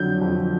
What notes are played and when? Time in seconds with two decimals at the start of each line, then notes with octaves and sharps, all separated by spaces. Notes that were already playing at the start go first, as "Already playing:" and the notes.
Already playing: F2 D3 F#3 G6
0.21 F2